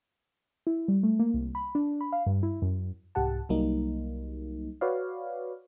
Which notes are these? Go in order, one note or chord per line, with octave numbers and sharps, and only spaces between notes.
E4
G3
A3
A#3
C2
B5
D4
B5
F5
G2
E4
F#2
C2 G#2 G4 F#5 A5
C2 F#3 G3 A#3 D#4
F#4 B4 C#5 D5 F5